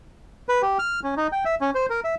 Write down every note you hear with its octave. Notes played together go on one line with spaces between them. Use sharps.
B4
G4
F6
C#4
D#4
G5
E5
C#4
C5
A#4
E5